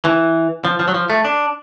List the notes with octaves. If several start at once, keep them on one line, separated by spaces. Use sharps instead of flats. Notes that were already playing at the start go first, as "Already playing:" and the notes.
E3
F3
F3
F#3
F3
A3
D4